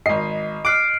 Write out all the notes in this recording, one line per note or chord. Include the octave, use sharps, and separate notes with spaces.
G#1 D#5 C7
D6 F6 F#6 C7 D7